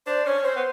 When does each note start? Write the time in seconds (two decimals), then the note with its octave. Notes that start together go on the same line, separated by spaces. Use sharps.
0.06 D4 C5
0.25 C#4 C#5
0.39 C#4
0.44 C4 C5
0.56 B3